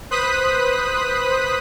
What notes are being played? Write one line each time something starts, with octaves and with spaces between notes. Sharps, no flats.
B4 C5 D#6 F#6 B6